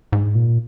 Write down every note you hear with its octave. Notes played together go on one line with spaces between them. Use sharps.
G#2
A#2